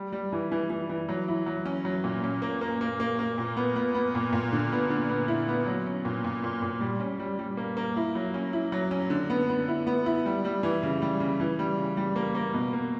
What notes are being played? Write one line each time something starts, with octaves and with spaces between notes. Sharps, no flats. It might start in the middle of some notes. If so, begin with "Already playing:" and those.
Already playing: G3
G3
E3
E3
E3
E3
F#3
E4
F#3
C#4
F#3
A#2
C#4
A#3
A#3
A#3
A#3
A#3
A#2
B3
B3
B3
A#2
A#2
D3
B3
D3
B3
E4
B3
F#3
C#4
A#2
A#2
A#2
A#2
G3
C#4
G3
G3
A#3
A#3
E4
F#3
C#4
E4
F#3
C#4
D3
B3
B3
E4
B3
E4
G3
G3
E3
C#3
G3
C#3
E3
G3
C#3
G3
A#3
A#3
B2
A#3